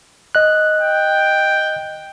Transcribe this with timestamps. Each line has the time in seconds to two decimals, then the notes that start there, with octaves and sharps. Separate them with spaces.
0.35 D#5 F#6
0.81 G5